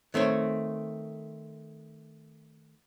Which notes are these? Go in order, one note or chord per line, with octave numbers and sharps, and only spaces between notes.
D#3 A3 C4 C#5